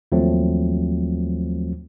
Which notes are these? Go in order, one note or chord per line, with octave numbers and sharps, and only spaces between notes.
D#2 F3 F#3 A3 C4